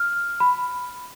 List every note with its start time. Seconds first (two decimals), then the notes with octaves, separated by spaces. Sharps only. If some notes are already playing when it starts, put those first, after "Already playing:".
Already playing: F6
0.40 B5